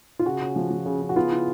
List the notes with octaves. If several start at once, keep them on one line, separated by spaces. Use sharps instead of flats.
F4
C#3 F#4
C#4
F3
F3
C#3
C#3
F#4
B3 F4
E4